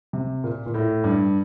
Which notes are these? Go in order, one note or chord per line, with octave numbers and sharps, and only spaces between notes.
C3
A#2
A#2
A2
G2